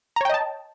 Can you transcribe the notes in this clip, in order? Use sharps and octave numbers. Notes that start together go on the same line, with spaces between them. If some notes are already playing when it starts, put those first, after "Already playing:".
C#5 D#5 G5 A5 A#5